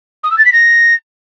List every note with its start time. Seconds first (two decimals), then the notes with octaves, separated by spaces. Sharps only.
0.24 D#6
0.31 E6
0.38 A6
0.45 B6
0.52 A#6